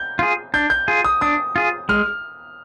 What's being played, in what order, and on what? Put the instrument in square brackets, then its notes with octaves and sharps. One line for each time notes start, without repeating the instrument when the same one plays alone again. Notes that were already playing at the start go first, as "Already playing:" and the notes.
Already playing: [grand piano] G6
[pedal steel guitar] F4 G#4
[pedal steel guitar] D4 [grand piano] G6
[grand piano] G6
[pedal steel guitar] F4 G#4
[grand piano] D#6
[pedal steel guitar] D4 [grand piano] D#6
[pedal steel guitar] F4 G#4
[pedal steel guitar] G#3 [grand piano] F6